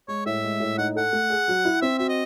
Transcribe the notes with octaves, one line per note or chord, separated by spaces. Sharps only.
G#3 C#5
A2 E5
G#3
A2
D#4 F#5
A4 F#5
A3
G#4
F#3
E4
C4 E5
F#4 E5
D#5